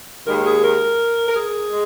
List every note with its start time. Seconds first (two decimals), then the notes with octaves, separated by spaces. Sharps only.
0.25 D#2 D#3 G#3 A#4
0.44 G#4
0.62 A#4
1.27 A#4
1.34 G#4
1.70 G#3